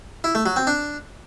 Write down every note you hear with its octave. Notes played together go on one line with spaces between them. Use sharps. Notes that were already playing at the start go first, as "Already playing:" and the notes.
E4
A3
F#3
C4
D4